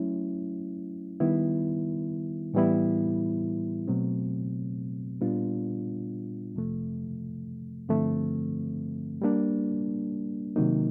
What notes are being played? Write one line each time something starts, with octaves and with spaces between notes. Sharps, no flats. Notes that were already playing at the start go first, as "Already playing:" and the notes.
Already playing: F#3 A3 C#4 E4
D#3 G3 B3 E4
A2 E3 G3 B3 E4
B2 F#3 A3 C4
A#2 G3 B3 D4 F4
F2 C3 F3 A3
G2 D3 F3 A3 C4
G3 A#3 D4
C3 D#3 F#3 A#3 D#4